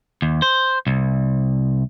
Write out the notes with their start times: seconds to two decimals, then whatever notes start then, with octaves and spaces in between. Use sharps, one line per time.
0.22 D#2
0.42 C5
0.87 C2